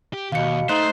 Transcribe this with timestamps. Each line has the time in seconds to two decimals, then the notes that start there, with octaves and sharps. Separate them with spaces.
0.13 G4
0.32 D#2 B2 F5 C#7
0.69 A3 D#4 C5 D#5 F#6